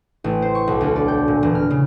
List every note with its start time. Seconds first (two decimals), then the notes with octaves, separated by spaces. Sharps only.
0.24 A1
0.42 C5
0.55 C#6
0.67 B1
0.81 D2
0.96 D5
1.08 G5
1.28 A#2
1.43 E1
1.55 F6
1.70 C#3